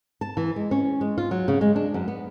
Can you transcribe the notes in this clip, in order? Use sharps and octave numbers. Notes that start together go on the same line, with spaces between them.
A5
E3
G#3
C#4
G#3
F4
F#3
C#3
G#3
D4
F#2
B3